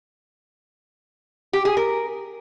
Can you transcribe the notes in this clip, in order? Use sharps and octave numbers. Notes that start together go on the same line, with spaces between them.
G4
G#4
A#4